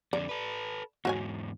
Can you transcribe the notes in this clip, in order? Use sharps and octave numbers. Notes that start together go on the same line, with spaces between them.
F2 D3 D5
A4 B4
E2 G#2 F#4 C#5 G#5